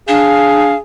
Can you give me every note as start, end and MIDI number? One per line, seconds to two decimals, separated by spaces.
0.08 0.72 62
0.08 0.81 68
0.08 0.75 77